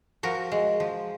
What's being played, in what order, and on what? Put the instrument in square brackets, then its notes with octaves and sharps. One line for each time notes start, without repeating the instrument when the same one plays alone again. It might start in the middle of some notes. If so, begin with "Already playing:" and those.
[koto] F3 F#4 A#4
G#3
F3